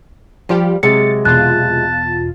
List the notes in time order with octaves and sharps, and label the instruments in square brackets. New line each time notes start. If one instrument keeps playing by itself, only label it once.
[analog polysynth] F3 F4 G4 [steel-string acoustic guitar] G3
[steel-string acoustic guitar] C3 F#3 G#3 [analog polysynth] A6 [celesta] C#7
[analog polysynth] E2 B2 F4 [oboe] A5 [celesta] F#6